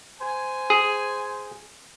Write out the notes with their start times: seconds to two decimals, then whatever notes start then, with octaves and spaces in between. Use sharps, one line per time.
0.21 C5 G#5
0.70 G#4